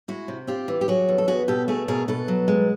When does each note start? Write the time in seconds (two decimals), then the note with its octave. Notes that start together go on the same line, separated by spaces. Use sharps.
0.08 G#3 E4 F#4
0.28 C3
0.47 C4 F4 G4
0.68 E3
0.81 G4
0.88 F#3 F#4 G#4
1.08 E2
1.18 A4
1.28 B3 F#4 G#4
1.48 B2 G4 A4
1.68 A3 F#4 G#4
1.88 B2 G#4 A#4
2.08 B2 A4 B4
2.28 F#3
2.48 G#3